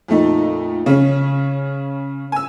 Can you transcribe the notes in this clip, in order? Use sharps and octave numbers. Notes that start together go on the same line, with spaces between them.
F2 A#2 A3 D#4
C#3 C#4
G#5 E6